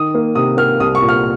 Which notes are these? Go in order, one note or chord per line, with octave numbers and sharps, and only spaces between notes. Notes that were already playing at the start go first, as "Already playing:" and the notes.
Already playing: D#3 D#6
A#3
C3 D#6
A#3 F6
C2 D#6
C#6
A#2
F6